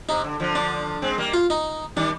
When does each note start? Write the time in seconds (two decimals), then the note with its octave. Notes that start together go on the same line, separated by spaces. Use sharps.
0.09 C3 D#4
0.24 D3
0.40 D3 F3
0.55 D4
1.02 G#3 C4
1.18 G3 A#3
1.34 F4
1.50 D#4
1.96 D#3 G3 D4